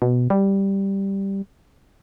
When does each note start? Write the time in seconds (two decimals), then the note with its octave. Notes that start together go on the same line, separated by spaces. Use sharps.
0.02 B2
0.30 G3